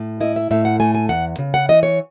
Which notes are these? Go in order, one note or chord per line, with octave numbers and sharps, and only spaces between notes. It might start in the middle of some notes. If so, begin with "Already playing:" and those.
Already playing: A2
E4 D#5
E5
A2 E5
F#5
A3 G#5
G#5
E2 F#5
C#3
F#5
E3 D#5
C#5